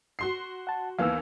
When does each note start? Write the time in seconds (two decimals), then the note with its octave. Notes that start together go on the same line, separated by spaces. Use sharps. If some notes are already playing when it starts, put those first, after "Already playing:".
0.19 F#4 C6 C7
0.67 F#5 A5
0.99 D#2 E3 B3 F5 E6